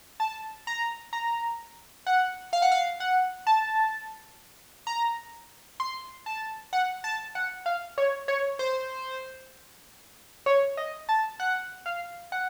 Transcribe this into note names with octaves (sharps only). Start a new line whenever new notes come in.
A5
A#5
A#5
F#5
F5
F#5
F5
F#5
A5
A#5
C6
A5
F#5
A5
F#5
F5
C#5
C#5
C5
C#5
D#5
A5
F#5
F5
F#5